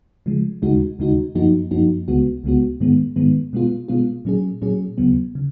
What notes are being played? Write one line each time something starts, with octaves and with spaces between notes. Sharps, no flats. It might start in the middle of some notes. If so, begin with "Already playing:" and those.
C#3 F3 G#3
D#2 C#3 G#3 D#4 F#4
D#2 C#3 G#3 D#4 F#4
F#2 F3 A#3 D#4 F#4
F#2 F3 A#3 D#4 F#4
C#2 C#3 G#3 B3 F#4
C#2 C#3 G#3 B3 F#4
G#2 D#3 G#3 B3
G#2 D#3 G#3 B3
B2 G#3 B3 F4
B2 G#3 B3 F4
A#2 F#3 C#4 G#4
A#2 F#3 C#4 G#4
D#2 C#3 F#3 B3
C#3